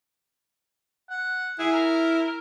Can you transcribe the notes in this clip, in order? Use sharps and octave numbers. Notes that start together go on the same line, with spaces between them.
F#5
E4 G#4
A#4